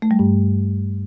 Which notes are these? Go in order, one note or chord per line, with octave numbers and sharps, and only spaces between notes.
A3
G3
G2